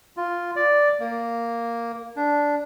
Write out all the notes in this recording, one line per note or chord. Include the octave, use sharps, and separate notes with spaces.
F4
D5
A#3
D4